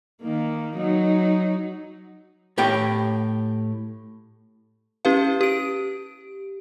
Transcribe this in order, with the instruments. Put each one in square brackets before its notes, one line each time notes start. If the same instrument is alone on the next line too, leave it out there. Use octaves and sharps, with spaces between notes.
[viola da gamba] D#3 A#3
F#3 D#4
[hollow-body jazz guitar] A2 G4 C#5 G5
[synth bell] C#4 E4 G4 B4 F5
G4 D7